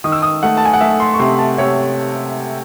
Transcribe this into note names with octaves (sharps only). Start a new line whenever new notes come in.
D#3 D#6
E6
D#6
A3 F#5
A5
G#5
F#5
A3 E5
C6
C#6
C3 C6
A5
C3 C#5